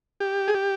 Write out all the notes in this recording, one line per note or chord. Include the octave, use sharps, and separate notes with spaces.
G4
G#4
G4